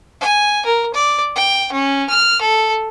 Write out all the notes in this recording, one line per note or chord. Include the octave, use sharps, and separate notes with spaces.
G#5
A#4
D5
G5
C#4
F6
A4